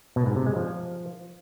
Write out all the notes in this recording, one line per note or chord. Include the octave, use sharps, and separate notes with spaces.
B2
G#2
C3
G#3
F3